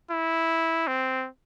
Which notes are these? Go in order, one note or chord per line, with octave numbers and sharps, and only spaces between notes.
E4
C4